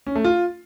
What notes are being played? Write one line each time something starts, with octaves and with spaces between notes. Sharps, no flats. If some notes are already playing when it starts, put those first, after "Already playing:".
C#4
A3
F4